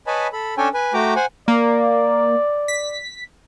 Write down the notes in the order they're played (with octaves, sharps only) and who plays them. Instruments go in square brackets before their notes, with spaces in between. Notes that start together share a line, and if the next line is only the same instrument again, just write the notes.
[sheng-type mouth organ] B4 C#5 D#5 G#5 A5 B5
A4 B5
C#4 D4 A4 C#5 G5 G#5
B4 G#5
A3 F#4 G5 A#5 D6
C5 F#5 G#5
[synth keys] A#3 [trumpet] D5
[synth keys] B6